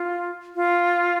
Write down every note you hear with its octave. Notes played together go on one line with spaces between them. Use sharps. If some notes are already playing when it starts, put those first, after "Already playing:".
Already playing: F4
F4